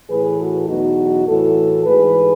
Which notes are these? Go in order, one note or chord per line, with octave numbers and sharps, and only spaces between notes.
A2 E3 G#4 B4
F#4 A4
E2 B2 F#3 D#4 F#4
A2 E3 F#4 A4
G#2 E3 G#4 B4